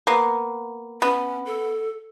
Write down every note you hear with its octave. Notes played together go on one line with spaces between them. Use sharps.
A#3 B3
B3 C#4
A4